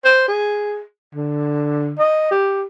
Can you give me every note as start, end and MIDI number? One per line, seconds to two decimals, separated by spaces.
0.04 0.24 72
0.28 0.82 68
1.15 1.93 50
1.98 2.28 75
2.31 2.64 67